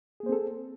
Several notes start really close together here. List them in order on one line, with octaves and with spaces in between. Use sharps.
G#4 A#3 C5 C4 A4